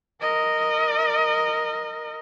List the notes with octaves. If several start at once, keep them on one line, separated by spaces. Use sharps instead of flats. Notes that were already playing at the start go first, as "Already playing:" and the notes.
A#4 D#5